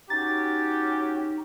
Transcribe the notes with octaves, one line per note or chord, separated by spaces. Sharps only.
C#4 D#4 F#4 G4 A6